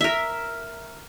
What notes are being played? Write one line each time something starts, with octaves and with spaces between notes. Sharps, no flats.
A#4 E5